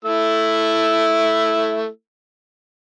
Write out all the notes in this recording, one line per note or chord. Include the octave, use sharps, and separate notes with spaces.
A3 E4 E6